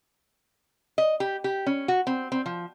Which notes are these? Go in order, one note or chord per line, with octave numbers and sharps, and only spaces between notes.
D#5
G4
G4
C#4
F#4
C4
C4
F3